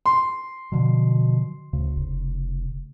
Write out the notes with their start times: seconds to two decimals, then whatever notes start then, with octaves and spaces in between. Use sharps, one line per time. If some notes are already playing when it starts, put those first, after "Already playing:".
0.06 C6
0.72 B2 D3 F3 F#3
1.73 D2 C#3
1.96 F1